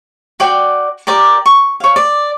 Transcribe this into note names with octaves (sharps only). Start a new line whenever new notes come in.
F#4 D5 G5
G4 A#4 D5 D6
C#6
C#5 F5
D5